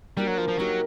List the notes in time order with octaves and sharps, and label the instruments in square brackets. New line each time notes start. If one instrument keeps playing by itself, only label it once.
[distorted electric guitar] G3 [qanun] A#3 D4 F#4
[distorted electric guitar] F#3
F3
F3
[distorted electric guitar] F#3 [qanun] A#3 D#4 G4 A#4